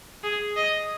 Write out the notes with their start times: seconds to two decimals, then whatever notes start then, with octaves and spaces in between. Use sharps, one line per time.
0.24 G#4
0.57 D#5